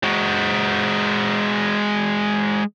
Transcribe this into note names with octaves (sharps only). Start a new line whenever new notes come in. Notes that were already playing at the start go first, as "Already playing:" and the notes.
G#3 F#4